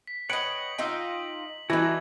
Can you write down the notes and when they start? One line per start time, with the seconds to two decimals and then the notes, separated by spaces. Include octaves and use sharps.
0.07 B6
0.30 B4 C#5 D#5 F#5 G5 F#7
0.78 D#4 F4 D#5 G5 E6
1.70 E3 A3 D#4 F#4 D5 E6 G#6